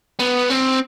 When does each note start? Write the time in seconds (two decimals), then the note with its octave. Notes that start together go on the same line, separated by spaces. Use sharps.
0.20 B3
0.50 C4